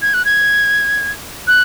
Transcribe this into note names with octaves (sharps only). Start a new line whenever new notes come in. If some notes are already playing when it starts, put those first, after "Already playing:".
G#6
F#6
G#6
F#6